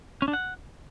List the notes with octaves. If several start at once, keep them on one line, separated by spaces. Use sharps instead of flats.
C#4
D4
F#5